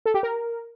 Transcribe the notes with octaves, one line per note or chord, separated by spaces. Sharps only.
A4
G4
A#4